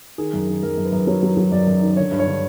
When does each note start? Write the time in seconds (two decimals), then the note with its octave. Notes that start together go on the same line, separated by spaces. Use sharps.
0.18 D#3 G#4
0.33 F#2
0.48 D#3
0.63 F#2 A#4
0.78 F#2
0.85 B4
0.92 F#2
1.07 F#3 C#5
1.23 F#3
1.37 F#3
1.52 F#2 D5
1.67 F#2
1.82 D#3
1.96 D3 C#5
2.11 G2
2.19 C#5
2.27 D3